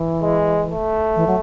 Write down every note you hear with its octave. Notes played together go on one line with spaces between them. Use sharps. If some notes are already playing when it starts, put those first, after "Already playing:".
Already playing: E3
G#3
A3
E3
F#3